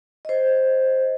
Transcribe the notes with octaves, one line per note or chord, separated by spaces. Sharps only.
C5 D#5